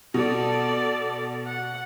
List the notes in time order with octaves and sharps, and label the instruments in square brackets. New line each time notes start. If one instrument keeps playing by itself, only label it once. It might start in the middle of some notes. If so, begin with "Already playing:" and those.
[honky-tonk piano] B2 [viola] A4 D5
[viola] F#5